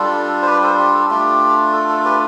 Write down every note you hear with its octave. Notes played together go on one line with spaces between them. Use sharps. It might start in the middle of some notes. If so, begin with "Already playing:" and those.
Already playing: G3 D4 F4 A4
C5
G4 B4
A4 C5
G4
A4
A3 D4 F4 G4
A4
A4
G4 B4